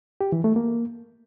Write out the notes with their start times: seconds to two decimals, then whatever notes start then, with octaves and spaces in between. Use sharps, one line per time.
0.21 G4
0.32 E3
0.44 A3
0.56 A#3